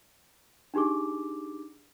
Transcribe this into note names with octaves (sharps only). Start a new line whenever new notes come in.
D4 D#4 G4 G#4 D6